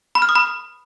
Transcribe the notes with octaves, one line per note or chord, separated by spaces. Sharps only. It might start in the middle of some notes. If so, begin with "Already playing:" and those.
B5
F6
D#6
B5